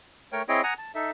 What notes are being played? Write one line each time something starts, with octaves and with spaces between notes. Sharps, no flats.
A3 A#4 C#5 G5
C4 E4 G#4 C#5 D#5 G5
F#5 G#5 A#5 D#6
A5
D#4 A4 E5